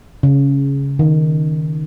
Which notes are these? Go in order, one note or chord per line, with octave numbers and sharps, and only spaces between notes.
C#3
D#3